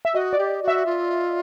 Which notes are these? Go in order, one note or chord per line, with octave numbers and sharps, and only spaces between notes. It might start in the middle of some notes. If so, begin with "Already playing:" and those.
E5
F#4 D#5
D5
G4
F#4 E5
F4